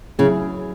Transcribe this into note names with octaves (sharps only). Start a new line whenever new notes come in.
C#3 F#3 E4 G#4